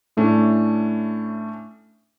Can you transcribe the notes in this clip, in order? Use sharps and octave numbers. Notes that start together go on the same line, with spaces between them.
A2 A3 C#4 D4